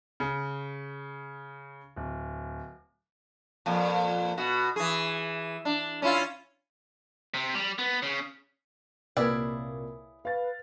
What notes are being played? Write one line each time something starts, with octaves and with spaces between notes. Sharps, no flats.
C#3
D1
F2 A#2
B2 F#4
E3 G#4
D4
C#4 E4 F4
C3
G3
B3
C#3
C2 A#2 E4 G#4 A#4 B4 C#5 D5
B4 F5 A6